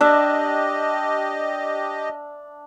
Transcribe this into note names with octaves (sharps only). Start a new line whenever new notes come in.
D4 G4 D#5 E5